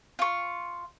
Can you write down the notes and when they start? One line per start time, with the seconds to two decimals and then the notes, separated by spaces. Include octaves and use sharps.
0.19 F4 C#6